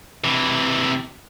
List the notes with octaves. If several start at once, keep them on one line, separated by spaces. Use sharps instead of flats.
C3 E3